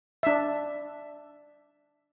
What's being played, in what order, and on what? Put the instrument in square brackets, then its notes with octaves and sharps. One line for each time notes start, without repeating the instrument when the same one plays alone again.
[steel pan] D4 E5